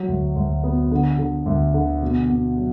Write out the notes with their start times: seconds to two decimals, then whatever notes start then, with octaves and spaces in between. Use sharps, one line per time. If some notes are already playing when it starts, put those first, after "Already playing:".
Already playing: F#3
0.08 D2
0.36 D2
0.64 B3
0.91 D3
1.18 D3
1.46 D2
1.74 D3
2.02 B2
2.29 B2
2.57 F#3